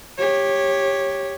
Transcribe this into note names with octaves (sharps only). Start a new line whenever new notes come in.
G4 C#5